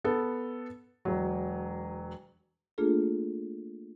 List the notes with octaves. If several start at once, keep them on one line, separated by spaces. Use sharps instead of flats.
B3 A4
E1 F#3
A3 A#3 D4 F4 G#4 A4